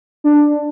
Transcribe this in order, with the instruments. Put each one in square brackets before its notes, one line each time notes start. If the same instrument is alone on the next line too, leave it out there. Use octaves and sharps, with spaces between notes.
[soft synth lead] D4